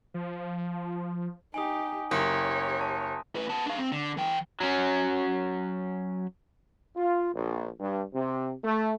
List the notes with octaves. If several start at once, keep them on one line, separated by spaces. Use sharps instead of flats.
F3
D#4 G4 G#5 D#6
F#1 G4 C#5 A#5 C6 D#6
A5
A2 B4
B3 A5
D4 F5
C4
D3
E3 G5
F#3 C#4
F4
A#1
G2
C3
A3